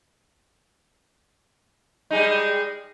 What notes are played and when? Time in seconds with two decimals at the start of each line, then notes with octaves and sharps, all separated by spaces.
2.11 G3 G#3 D#4